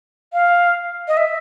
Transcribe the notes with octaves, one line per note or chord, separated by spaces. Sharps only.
F5
D#5
E5